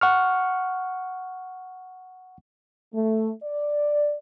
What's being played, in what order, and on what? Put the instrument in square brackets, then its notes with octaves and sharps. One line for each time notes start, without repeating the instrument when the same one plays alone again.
[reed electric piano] F#5 C#6 F6
[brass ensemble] A3
D5